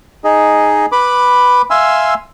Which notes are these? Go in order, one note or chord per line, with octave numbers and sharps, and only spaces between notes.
D#4 G#4 D#5
B4 B5 D6
E5 F5 G#5 C6 E6